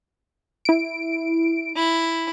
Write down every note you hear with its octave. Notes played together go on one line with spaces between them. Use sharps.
E4 D7
E4